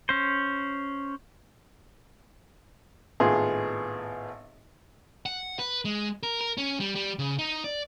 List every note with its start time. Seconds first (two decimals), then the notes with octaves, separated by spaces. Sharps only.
0.09 C#4 C5
3.20 G#1 A2 B3 F4 G#4
5.26 F#5
5.59 B4
5.85 G#3
6.23 A#4
6.41 A#4
6.58 C#4
6.80 G3
6.95 G3
7.19 C#3
7.39 D#4
7.64 D5